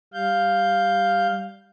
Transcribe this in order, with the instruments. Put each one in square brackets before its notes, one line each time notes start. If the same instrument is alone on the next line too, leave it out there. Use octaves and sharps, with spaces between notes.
[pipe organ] G3 F5 G6